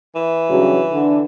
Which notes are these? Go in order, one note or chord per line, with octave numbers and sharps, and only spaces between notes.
E3
G2 C#3 F#3
D3